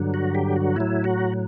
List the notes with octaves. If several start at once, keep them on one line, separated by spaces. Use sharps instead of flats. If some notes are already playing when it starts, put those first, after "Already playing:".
Already playing: G2 D3 F#3
F#4
G4
F#4
A2 F#3 E4
F#4